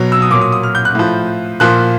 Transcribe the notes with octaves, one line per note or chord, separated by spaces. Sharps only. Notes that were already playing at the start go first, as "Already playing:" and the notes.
Already playing: B2 F#3
E6
D#6
A#2 F#3 D6
D#6
D#6
F6
G6
F#6
A2 F3
A#2 F3 F#6